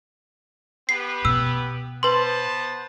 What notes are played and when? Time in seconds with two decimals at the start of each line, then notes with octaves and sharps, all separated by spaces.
0.89 B3 G4 B4 C7
1.25 B2 E6
2.03 B3 B4 C5 A5 C6